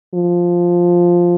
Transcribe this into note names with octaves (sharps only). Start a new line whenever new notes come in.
F3